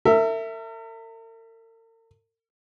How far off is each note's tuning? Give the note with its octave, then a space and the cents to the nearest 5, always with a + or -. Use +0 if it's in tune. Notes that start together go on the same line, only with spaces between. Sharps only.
A#4 -45 E5 +0